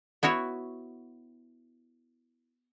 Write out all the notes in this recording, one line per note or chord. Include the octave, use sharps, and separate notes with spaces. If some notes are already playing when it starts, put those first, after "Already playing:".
B3 E4 F#4 C#5